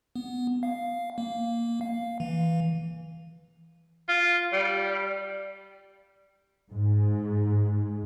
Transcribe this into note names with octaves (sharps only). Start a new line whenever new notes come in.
B3
F5
A#3
F5
E3
F4
G3
G#2